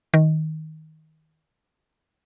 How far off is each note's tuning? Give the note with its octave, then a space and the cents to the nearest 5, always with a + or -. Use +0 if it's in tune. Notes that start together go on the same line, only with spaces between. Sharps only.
D#3 +15